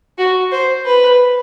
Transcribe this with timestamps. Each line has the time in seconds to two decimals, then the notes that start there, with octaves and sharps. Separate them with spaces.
0.18 F#4
0.52 C5
0.86 B4